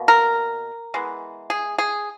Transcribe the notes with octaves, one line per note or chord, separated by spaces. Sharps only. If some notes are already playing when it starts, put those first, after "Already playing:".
Already playing: B2 A#3
A#4
E3 G#3 B3
G#4
G#4